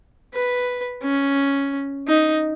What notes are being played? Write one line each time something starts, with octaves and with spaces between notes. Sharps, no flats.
B4
C#4
D#4